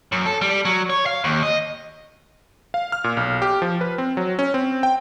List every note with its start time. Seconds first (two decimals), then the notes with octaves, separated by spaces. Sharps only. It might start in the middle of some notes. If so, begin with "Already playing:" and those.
0.12 F#2
0.26 A4
0.41 G3
0.65 F#3
0.90 C#5
1.06 F5
1.24 D#2
1.43 D#5
2.74 F5
2.92 F6
3.04 A#2
3.17 B1
3.42 G4
3.62 F3
3.81 B4
3.98 C4
4.17 F#3
4.39 C#4
4.54 C4
4.83 G5